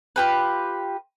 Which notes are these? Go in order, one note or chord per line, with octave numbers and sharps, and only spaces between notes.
F4 G4 B4